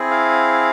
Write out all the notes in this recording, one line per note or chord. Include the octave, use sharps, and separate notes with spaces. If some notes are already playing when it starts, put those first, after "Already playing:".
Already playing: C4 E4 G#4
F5